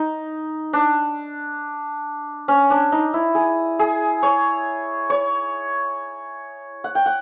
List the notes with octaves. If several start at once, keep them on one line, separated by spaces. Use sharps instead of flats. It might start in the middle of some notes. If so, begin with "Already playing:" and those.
Already playing: D#4
D4
C#4
D4
D#4
E4
G#4
G#4
C#5
C#5
F#5
G5
F#5